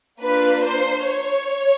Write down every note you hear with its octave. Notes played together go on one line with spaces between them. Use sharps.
A#3 D4 F4 B4
C5
C#5